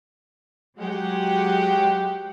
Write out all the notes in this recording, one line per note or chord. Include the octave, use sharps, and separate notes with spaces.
F#3 G#3 G4 F#5